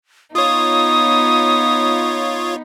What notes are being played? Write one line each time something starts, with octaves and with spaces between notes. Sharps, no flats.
B3 D#4 F4 C#5 D#6